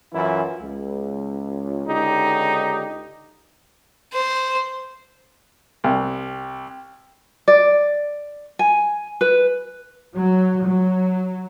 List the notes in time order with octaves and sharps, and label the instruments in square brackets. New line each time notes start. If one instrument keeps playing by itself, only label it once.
[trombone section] F#2 E3 E4 F4
C#2
C#2 D3 D#4 G4
[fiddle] C5
[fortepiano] C2
[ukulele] D5
G#5
B4
[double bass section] F#3
F#3